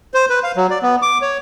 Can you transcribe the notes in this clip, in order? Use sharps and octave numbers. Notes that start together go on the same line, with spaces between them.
C5
B4
F5
F#3
D5
B3
D6
C#5